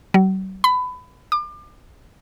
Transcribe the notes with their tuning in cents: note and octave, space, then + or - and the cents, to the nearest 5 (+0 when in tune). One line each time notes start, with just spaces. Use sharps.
F#3 +45
B5 +25
D6 +35